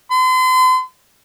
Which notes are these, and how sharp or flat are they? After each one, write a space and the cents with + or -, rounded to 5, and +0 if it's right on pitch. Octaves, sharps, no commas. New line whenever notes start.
C6 -40